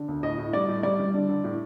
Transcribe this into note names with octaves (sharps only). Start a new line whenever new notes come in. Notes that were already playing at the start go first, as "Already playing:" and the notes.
Already playing: D3
D2
A2 D#5
A2
G3 D5
A2
G3 D5
G3
D3
D3
A2